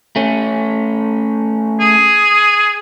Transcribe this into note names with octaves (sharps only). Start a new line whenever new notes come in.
A3 C#4
G#4